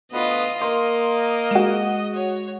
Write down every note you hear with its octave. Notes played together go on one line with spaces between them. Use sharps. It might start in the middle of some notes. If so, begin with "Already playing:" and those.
D2 B2 B3 F4 D#5
A#3 D#5 C6
G#3 F#4 E7
C#5